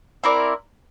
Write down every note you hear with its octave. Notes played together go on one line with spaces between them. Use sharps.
C4 E4 A#4 D5